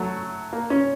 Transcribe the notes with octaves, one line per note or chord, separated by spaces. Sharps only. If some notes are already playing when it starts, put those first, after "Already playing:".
Already playing: F#3 A3
A#3
C#4